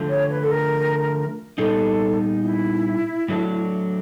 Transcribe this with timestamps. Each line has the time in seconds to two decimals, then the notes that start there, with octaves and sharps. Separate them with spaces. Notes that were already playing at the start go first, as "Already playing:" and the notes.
Already playing: D3 F3 A3
0.09 C#5
0.30 B4
0.44 A4
0.51 A#4
1.58 A#2 G3 B3 D#4 G#4 A4
2.43 E4
3.29 A2 F#3 A3 D4